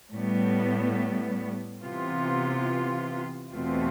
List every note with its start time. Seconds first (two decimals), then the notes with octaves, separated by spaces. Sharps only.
0.13 A2 G3 B3
1.83 C3 E3 B3 F4
3.53 E2 B2 A3 C4 F4